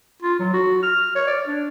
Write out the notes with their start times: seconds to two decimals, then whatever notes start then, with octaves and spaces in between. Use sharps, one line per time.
0.22 F4
0.39 F#3
0.53 F#4
0.83 F6
1.15 C#5
1.27 D5
1.46 D4